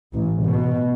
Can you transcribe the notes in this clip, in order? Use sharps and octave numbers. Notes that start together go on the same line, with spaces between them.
A1
B2